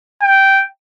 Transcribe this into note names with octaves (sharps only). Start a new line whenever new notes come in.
G5